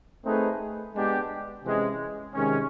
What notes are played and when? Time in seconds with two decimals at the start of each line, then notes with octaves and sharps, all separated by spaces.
0.24 A3 C4 D#4 G#4 B4
0.94 G#3 B3 D4 G4
1.64 C3 E3 G#3 C#4
2.34 C3 D#3 G#3 C#4